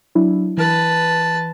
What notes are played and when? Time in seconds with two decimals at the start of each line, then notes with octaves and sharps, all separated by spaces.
0.15 F#3 D4 E4
0.57 E3 B4 A5